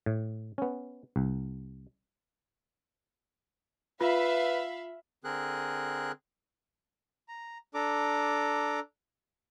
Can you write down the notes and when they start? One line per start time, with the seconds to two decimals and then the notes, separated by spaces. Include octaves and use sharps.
0.06 A2
0.58 B3 C#4
1.16 C2
4.01 F4 B4 E5 F5 B5
5.24 D3 C4 G#4 A#4 F#6
7.28 A#5
7.74 D4 A4 A#5 D6